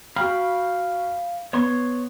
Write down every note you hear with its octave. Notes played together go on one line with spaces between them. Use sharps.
F#4 F5 G5 B5 F6
B3 C#5 C6 C#6